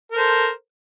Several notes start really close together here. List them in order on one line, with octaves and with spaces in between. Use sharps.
A#4 A4 C5